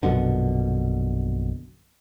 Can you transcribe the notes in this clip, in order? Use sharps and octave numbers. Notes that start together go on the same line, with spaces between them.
A#1 F#2 B2 D3